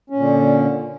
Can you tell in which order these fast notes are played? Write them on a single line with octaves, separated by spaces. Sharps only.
C#4 A#2 D3